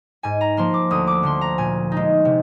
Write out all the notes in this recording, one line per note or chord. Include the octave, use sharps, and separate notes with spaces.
G#2 G#5
A#5
F3 A#3 C6
D6
D2 D#6
D6
D3 F3 C6
A#5
A#2 G#5
G#3 D#4
C3